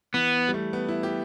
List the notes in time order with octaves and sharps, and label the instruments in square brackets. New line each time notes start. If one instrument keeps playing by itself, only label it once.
[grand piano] E3 [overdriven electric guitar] B3
[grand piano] G3
A3
B3
E4
G4